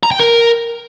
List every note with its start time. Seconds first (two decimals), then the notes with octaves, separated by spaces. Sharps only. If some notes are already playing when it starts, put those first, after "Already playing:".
0.03 A#5
0.11 G5
0.19 A#4